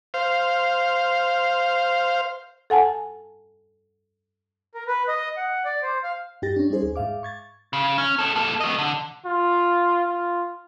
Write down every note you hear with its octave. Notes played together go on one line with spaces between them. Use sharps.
C5 F5
A4 F#5 G#5 A5
A#4
B4
D#5
F#5
D5
C5
F5
G2 D#4 G4 G5 A6 A#6
C#4 D4
G3 C#4 D#4 G#4 C5
D#2 G#4
G#2 E5 F5 D6
C#6 G#6 A6
C#3
C#4
B3 A4
A#3 A4
A3 D#5
D3
F4
F4